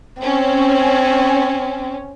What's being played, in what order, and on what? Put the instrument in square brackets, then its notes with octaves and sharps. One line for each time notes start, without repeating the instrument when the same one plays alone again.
[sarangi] C4 [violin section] C#4